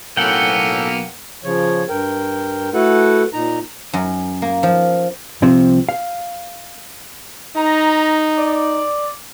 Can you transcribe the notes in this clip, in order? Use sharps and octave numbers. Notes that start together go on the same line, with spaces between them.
B1 A2 A#3 B3 C#4 A4 F#5 G5
C#3 F3 C#5
G2 A#4 G5
A3 E4 F#4 A4 B4 F#5
A#2 D#4 A#5
F#2
A#3
F3
C2 C3 F3 C4
F5
D#4 A#5
D5